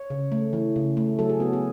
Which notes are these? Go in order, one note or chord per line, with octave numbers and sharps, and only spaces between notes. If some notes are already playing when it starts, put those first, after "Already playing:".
Already playing: C#5
C#3
A3
E3
C#3
A3
F#3 A4
G#4
B3 F#4
G#4